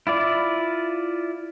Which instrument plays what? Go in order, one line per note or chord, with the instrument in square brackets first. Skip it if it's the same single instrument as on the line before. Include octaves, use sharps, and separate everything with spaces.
[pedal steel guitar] E4 F4 D5